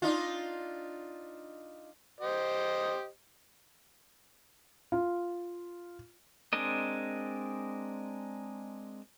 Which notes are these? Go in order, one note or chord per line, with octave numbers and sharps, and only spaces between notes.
D4 D#4 F4
G4 C5 D#5
F4
G#3 C4 D4 A#4 D#5